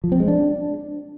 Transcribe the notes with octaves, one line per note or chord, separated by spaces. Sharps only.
F3
C4
G#3
D4